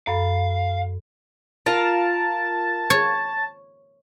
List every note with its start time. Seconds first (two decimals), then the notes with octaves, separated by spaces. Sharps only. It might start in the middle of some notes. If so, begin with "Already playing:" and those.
0.07 F#2 A4 F5 B5
1.66 F4 A#4 F5 A5
2.90 C#5